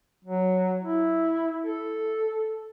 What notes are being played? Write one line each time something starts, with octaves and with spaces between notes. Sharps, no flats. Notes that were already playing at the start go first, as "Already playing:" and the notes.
F#3
E4
A4